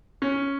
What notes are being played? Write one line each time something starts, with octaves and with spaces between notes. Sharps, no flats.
C#4